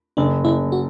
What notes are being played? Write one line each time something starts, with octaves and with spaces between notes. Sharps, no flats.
F#1 D4
F#1 E4
F#4